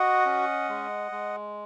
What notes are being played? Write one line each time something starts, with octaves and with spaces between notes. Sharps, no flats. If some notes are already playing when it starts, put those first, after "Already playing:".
Already playing: F#4 D#5 F#5
C#4
G#3
G#3